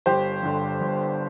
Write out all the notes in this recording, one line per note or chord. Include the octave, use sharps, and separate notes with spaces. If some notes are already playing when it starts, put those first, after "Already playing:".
G1 G4 C5
G2 D3
G1